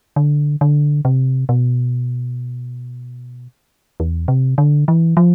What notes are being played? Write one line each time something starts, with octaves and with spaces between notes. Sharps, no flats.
D3
D3
C3
B2
E2
C3
D3
E3
F3